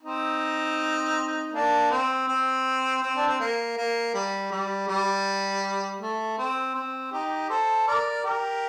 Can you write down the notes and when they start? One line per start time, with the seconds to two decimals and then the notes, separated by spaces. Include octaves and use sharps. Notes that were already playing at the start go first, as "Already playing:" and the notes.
0.03 C4 D#4
1.52 A#3 D4
1.90 C4
2.28 C4
3.02 C4
3.16 D4
3.27 C4
3.40 A#3
3.77 A#3
4.14 G3
4.51 G3
4.88 G3
6.01 A3
6.38 C4
6.75 C4
7.12 D#4 G4
7.50 A4 C5
7.88 A#4 D5
8.24 G4 A#4